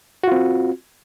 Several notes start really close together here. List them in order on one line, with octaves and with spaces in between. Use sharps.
F#4 F4 C4